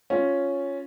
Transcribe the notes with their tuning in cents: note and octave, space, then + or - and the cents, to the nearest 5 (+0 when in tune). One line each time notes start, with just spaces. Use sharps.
C#4 +0 F4 +5